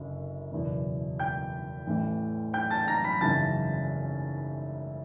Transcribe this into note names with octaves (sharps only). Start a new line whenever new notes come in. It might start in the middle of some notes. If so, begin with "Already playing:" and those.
Already playing: F#1 F#2 D3
F#1 E2 B2
G5 G6
A1 A2 E3
G5 G6
A5 A6
A#5 A#6
B5 B6
G#1 F#2 C#3 E3 A5 A6